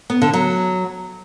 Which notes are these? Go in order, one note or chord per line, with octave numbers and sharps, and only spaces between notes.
B3
D3
F#3